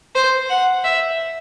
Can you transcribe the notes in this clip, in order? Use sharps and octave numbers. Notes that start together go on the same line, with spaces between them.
C5
F#5
E5